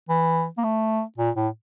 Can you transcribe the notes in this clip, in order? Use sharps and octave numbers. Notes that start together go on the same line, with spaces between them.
E3
A#3
A3
A#2
A2